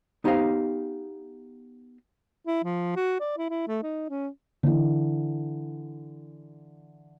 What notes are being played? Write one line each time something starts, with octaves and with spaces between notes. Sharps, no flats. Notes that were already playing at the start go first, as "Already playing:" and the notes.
B3 D#4 G4 C5 D#5 F5
E4
F3
F#4
D5
E4
E4
A3
D#4
C#4
D3 E3